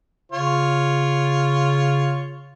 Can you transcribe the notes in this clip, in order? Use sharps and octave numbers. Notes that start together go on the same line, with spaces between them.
C#3 F4 C#5